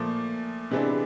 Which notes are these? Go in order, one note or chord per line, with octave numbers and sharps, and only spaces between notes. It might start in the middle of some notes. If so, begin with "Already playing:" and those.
Already playing: A#2 F3 A3
C3 E3 G#3 B3 D4